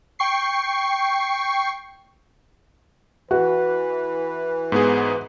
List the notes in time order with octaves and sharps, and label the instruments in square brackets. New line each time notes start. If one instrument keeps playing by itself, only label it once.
[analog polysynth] G5 C#6 C7
[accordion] E3 [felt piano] F#4 [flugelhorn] B4
[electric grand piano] G#2 B3 G#4